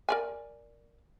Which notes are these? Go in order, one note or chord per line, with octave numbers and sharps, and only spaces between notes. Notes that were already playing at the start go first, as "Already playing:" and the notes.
A#4 D5 G#5